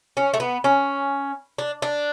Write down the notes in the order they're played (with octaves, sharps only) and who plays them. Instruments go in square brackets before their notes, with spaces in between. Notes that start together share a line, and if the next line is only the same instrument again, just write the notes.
[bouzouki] C#4
A3
B3
C#4
D4
D4